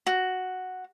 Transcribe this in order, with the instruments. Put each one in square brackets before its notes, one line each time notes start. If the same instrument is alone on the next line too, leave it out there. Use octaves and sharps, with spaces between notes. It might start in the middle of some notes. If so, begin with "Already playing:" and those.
[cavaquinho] F#4